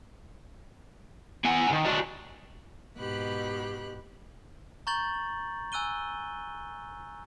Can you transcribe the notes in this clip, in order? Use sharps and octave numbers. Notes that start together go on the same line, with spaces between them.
B3 F#5 G#5
B2 D#3
D4 F#4 D5 D#5
G#2 B2 G4 B5 F#6
A#5 C#6 G6 A6 F#7
G#5 E6 F#6 D#7 G7